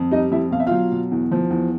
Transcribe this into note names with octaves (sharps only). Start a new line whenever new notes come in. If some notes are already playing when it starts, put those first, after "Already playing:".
Already playing: F2
G3 D#4 D#5
F2 E4 E5
B2 F5
E5
F#3 F4 F5
B2
E2
F3
E2